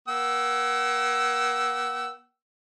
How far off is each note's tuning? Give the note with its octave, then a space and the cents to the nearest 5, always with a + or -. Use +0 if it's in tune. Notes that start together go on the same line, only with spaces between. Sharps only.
A#3 +40 F#5 +40 E6 +0